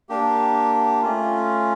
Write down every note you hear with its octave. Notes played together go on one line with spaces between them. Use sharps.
A#3 D4 G4
A3 C#4 F4